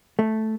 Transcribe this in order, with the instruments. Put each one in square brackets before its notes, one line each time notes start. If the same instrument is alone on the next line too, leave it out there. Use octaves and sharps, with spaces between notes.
[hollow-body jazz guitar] A3